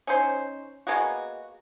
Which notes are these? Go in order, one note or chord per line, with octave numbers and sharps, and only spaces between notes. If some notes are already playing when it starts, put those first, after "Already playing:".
C#4 D#4 C5
G#3 A#3 B3 F#4